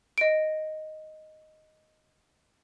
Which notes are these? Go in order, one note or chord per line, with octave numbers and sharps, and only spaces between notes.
D#5 D7